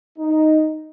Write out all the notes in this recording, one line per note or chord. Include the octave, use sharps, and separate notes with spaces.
D#4